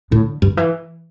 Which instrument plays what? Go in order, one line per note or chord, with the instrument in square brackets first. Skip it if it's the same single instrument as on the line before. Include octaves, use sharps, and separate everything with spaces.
[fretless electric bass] A2 [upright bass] D3
[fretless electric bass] G2 [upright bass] D3
[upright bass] E3